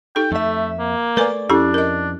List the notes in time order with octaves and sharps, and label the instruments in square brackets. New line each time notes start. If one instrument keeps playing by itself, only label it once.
[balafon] D#4 G4 A4 [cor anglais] G5
[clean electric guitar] F2 E5 [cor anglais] A3
[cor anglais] A#3
[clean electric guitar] A3 D5 [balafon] A#4 B4 G#5
[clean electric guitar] F2 [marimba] C#4 E4 G4 [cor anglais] D4 [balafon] A4
[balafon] A#4 D#5